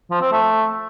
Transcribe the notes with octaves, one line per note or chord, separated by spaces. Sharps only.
F3
C4
A3